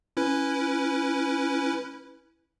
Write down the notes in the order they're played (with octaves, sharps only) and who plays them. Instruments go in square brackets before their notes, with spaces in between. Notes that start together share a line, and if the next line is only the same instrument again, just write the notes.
[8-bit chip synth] C#4 E4 B4